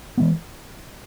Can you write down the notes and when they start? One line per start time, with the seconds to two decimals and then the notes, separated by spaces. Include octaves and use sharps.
0.18 E3 G#3 B3